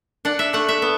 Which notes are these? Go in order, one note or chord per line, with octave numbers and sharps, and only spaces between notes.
D4 F#5
E5
A3 F#5
E5
B3